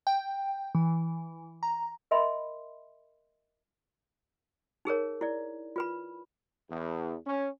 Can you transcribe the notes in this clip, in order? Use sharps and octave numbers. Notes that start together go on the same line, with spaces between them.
G5
E3
A#5
A#4 D#5 E5 G#5 B5 C6
D#4 G#4 A#4 C#5
E4 D5
F4 B4 B5
E2
C#4